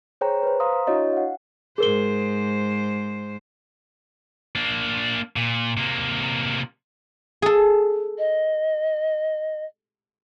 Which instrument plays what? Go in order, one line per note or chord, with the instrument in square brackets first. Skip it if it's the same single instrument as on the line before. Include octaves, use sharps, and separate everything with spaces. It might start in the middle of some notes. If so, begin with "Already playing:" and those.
[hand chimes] G#4 C5 C#5 G5 A#5
B4 C5
F5 A#5 C6 D#6
D4 E4 F#4 C#5 D#5
F5 F#5
[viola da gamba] G#2 C5 [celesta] G#4 A#4 G7
[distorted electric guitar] A#3 D4
A#2
C3 A#3
[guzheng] G#4 A4
[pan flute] D#5